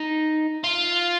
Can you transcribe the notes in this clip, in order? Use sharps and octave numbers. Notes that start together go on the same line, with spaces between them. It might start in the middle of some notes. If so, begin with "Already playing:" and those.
Already playing: D#4
F4